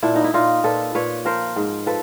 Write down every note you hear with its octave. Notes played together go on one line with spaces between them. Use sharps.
A#2 D4 E4
D#4
E4
A#2 D#4 F4
A#2 A4 B4
A#2 B4 C#5
F3 A#4 C5
G#2
F3 A4 B4